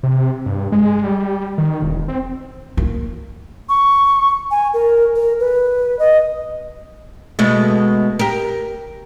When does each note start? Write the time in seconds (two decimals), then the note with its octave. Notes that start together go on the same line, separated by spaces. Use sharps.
0.03 C3
0.46 G2
0.72 G#3
1.03 G3
1.58 D#3
1.82 E1
2.08 C4
2.77 A#3
3.69 C#6
4.51 G#5
4.73 A#4
5.15 A#4
5.40 B4
5.99 D#5
7.39 B2 G#3 A3
8.19 G4 A#4